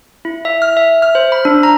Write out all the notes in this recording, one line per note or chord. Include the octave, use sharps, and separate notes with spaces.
E4
E5
F6
E5
F6
C5
B5
D4
A#5